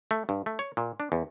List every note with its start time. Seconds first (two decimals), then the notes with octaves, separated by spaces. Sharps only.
0.11 A3
0.29 G2
0.46 A3
0.59 C#5
0.77 A#2
1.00 D4
1.12 E2